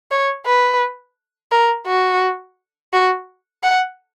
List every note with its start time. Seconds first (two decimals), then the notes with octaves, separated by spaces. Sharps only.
0.11 C#5
0.45 B4
1.52 A#4
1.87 F#4
2.93 F#4
3.63 F#5